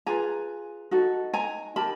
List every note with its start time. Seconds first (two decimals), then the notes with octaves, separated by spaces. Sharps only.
0.06 F4 G#4 B4 G#5 A#5
0.91 D#4 F#4 A4
1.34 G#5 A#5
1.76 D#4 G4 A#4 A5 B5